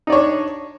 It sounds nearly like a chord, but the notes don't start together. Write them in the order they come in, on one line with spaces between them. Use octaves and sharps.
D#4 D5 C#5 D4